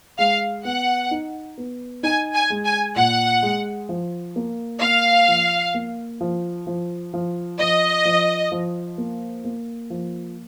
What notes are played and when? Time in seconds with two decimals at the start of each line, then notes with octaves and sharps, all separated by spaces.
0.19 G#3 F5
0.65 B3 F#5
1.11 D#4
1.58 B3
2.03 D#4 G#5
2.34 G#5
2.50 G#3
2.65 G#5
2.96 A#2 F#5
3.43 G#3
3.89 F3
4.36 A#3
4.81 A#3 F5
5.28 F3
5.74 A#3
6.21 F3
6.67 F3
7.14 F3
7.59 F3 D#5
8.05 F3
8.52 F3
8.98 A#3
9.45 A#3
9.90 F3